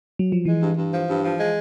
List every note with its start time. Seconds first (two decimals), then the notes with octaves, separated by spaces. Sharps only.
0.19 F#3
0.32 F3
0.45 E3 G#3
0.61 G2
0.76 G2
0.92 F3
1.08 G2
1.23 F3
1.39 G#3